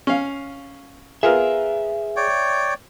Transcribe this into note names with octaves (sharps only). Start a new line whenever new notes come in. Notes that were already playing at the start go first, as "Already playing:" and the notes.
C#4 F5
B3 F4 G#4 A#4 E5
C#5 D5 G5